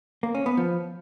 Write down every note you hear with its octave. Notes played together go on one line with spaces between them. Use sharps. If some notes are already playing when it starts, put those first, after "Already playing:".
A#3
C#4
B3
F3